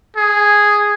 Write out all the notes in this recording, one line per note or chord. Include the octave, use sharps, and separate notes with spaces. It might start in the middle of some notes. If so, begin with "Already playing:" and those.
G#4